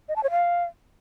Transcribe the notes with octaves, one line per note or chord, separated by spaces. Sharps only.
D#5
A5
C#5
F5